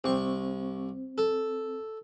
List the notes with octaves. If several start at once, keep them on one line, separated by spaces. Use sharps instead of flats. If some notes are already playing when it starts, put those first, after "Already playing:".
C2 C4 C#6
A4